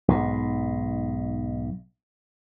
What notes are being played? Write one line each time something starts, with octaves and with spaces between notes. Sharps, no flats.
B1 G#2